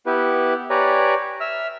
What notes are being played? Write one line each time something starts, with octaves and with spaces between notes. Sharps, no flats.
B3 E4 G4 B4
G4 B4 C#5 D5 G#5 A#5
E5 E6 F6